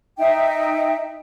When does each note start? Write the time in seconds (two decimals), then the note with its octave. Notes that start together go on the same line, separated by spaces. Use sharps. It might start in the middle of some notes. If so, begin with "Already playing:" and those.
0.18 D#4 E5 G5